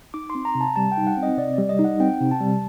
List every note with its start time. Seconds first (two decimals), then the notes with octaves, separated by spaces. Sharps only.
0.14 D#4 D6
0.30 C6
0.35 C4
0.45 A#5
0.55 C3
0.61 A5
0.76 G3 A5
0.92 G5
0.97 D#4
1.07 F#5
1.17 C4
1.23 D#5
1.37 C3 D5
1.54 G3 D5
1.69 D#5
1.79 D#4
1.84 F#5
2.00 C4 G5
2.20 C3
2.31 A5
2.41 G3